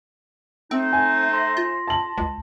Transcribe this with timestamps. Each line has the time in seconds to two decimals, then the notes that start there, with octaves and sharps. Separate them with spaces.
0.71 A3 C4 D#4 C5
0.93 G#5
1.33 C6 A#6
1.57 F4
1.87 A5 F#7
2.18 C#2